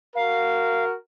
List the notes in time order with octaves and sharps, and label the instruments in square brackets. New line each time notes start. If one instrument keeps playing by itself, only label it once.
[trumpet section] F#4 A#4 [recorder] F5